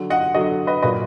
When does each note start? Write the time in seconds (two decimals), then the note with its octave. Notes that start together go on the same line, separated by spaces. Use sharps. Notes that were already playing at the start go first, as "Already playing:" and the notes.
Already playing: D3 F#3
0.10 D#5 F#5
0.34 D3 F#3 D#5 F#5
0.67 B4 D#5
0.82 A#2 F#3 B4 D#5